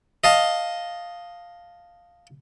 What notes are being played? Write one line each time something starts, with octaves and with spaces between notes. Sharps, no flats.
D#5 F5 A5